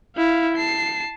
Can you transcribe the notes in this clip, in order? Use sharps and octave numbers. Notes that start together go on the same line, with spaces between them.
E4 F5
A5 C7